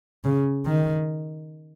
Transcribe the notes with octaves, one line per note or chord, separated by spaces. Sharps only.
C#3
D#3